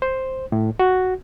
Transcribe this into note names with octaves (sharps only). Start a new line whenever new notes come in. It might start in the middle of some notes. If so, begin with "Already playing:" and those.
C5
A2
F#4